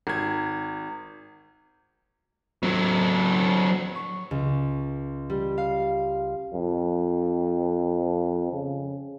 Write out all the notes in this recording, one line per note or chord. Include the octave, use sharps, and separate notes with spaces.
G#1 G#6
F#3 C4
C#6
C#2
G3
F5
F2
C#3